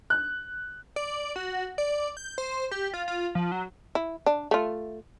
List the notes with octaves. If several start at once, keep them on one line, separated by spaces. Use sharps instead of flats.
F#6
D5
F#4
D5
G6
C5
G4
F4
F4
F3
F#3
E4
D4
A3 F4